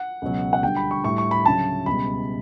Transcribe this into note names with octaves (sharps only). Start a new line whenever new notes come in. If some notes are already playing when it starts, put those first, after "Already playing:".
Already playing: F#5
C#2 B2 F#3
F#5
D2 D3 G3 G5
B5
C#6
A2 G3 C#6
C#6
B5
D2 C#3 F#3 A5
C#2 B2 G3 B5